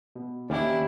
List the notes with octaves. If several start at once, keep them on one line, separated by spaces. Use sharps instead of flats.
B2
D#2 C#4 D4 E4 G4